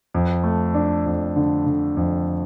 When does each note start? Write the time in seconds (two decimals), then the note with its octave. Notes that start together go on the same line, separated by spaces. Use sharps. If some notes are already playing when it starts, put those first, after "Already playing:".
0.14 F2
0.44 A3
0.74 D4
1.06 F2
1.36 D3
1.66 D3
1.97 F2